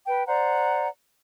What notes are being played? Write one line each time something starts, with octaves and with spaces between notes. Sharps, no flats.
B4 G5
C5 D5 F#5 A#5